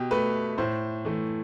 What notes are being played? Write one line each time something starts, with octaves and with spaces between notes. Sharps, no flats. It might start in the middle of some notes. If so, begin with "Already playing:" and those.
Already playing: B2 G4
A3 B4
A2 C5
E3 A3